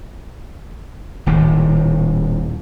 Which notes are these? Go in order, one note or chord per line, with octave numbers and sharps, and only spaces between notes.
D#1 D#2 A2